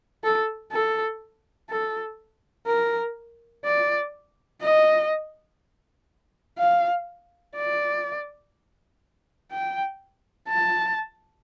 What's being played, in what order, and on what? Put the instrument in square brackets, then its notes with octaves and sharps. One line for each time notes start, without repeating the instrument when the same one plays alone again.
[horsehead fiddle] A4
A4
A4
A#4
D5
D#5
F5
D5
G5
A5